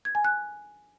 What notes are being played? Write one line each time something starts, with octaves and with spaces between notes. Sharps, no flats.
G#6
G#5
F#6